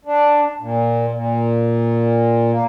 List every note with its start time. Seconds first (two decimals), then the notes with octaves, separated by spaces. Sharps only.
0.05 D4
0.60 A#2
1.12 A#2
2.52 A#3